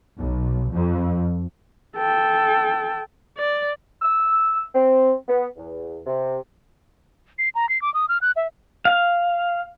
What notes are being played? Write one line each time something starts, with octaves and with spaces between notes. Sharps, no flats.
B1
F2
A4 G5
D5
E6
C4
B3
E2
C3
C7
A#5
C7
D6
D#6
F6
F#6
E5
F5